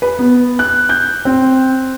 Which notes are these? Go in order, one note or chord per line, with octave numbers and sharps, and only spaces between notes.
B4
B3
F#6
G6
C4